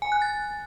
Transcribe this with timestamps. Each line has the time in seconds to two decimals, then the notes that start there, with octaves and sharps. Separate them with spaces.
0.02 G#5
0.12 F#6
0.22 A6